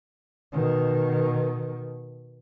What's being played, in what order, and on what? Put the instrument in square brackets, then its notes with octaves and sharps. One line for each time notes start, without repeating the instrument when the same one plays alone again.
[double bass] B2 D#3